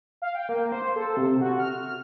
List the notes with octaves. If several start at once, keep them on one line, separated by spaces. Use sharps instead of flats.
F5
G5
A#3
C5
A4
C3
F#4
F6